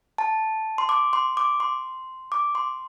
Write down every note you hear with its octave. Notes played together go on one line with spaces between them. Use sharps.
A5
C6
D6
C6
D6
C6
D6
C6